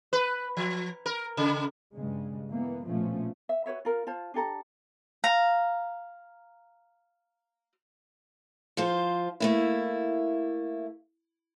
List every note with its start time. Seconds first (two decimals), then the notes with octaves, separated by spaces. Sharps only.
0.13 B4
0.57 F3
1.06 A#4
1.37 C#3
1.95 G2 C#3 G#3
2.51 E3 A#3 B3
2.84 A#1 B2 F3 A3 C#4
3.49 E5
3.66 F#4 B4 C#5 E5
3.85 F4 A#4
4.07 F4 C5 A5
4.34 D4 G4 A4 A#5
5.24 F5 A#5
8.77 F3 F4 C5
9.40 A3 A#3 E4